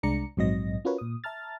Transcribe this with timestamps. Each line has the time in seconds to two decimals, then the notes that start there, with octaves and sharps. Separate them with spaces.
0.03 C2 G#3 D4 D5 A#5 C#7
0.37 A#1 G#2 F#3 C4 D#5 A#6
0.85 C#4 F4 F#4 A#4 B4 C#5
0.98 A#2 D#6
1.24 E5 A5 A#5 F6 A6